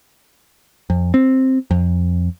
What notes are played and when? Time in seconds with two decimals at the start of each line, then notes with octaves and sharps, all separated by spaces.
0.90 F2
1.14 C4
1.71 F2